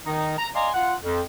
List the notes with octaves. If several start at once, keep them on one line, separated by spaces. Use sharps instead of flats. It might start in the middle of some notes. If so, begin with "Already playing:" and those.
D#3 D#4
A#5
D5 D#5 F5 G#5 A#5 C6
F4 F#5
F2